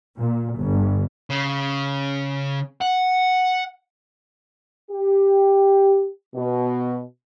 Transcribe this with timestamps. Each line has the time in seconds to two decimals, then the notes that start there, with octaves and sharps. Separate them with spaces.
0.19 A#2
0.59 G1
1.30 C#3
2.82 F#5
4.91 G4
6.35 B2